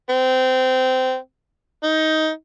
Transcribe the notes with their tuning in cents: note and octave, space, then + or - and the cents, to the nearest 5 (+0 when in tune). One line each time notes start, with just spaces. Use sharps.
C4 -20
D#4 +15